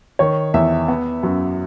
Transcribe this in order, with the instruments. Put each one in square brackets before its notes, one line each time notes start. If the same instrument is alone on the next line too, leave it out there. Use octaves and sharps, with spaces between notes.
[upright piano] D#3 C#5
E2 E5
B3
F#2